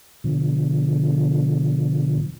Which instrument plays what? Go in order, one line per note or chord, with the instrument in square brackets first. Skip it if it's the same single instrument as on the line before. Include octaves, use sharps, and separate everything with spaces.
[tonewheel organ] B2 D3 F3